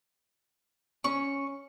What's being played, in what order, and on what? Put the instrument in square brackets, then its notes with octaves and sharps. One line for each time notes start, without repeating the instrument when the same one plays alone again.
[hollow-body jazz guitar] C#4 [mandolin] C#6